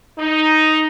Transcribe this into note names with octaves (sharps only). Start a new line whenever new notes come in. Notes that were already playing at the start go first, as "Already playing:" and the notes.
D#4